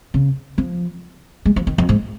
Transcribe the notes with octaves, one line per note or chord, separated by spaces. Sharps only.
C#3
F3
G#3
F3
D#3
F2
G#2